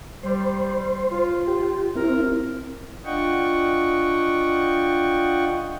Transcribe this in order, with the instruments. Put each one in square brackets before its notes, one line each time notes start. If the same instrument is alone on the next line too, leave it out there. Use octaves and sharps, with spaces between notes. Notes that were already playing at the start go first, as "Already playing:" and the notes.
[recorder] G3 [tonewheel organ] C5
[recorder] F4
[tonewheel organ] G4
[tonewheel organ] C4 E4 [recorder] A#4
[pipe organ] D4 F4 D#5 F#5 G5 C#6